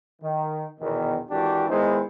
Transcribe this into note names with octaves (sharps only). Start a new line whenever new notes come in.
D#3
A#1 E2 B2 D#3
G#1 E3 D4 F#4 G4
D#3 G#3 B3 D#4 E4 C5